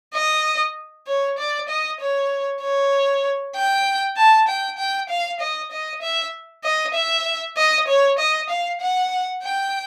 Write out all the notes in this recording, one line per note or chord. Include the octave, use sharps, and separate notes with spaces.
D#5
C#5
D5
D#5
C#5
C#5
G5
A5
G5
G5
F5
D#5
D#5
E5
D#5
E5
D#5
C#5
D#5
F5
F#5
G5